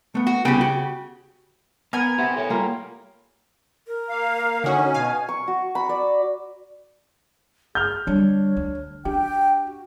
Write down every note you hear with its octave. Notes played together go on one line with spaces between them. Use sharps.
A3 B3
F#4
C2 C#3 B3 G4 G5
F#4
B3 A#4 G#5
B3 G4 C5 E5
A4 C#5
G3 A#3 F4
A#4
A#3 F5
D3 C#4 D#4 F#4
B2 F5 G#5
C#6
F#4
B5
D5
G#4 F6 G6
D3 G3 D4 C#5
D2
D4 G4 G5
F#4